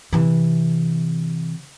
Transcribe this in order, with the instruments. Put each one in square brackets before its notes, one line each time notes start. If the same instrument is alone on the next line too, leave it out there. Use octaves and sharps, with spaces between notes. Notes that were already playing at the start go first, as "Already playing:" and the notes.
[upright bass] C3 E3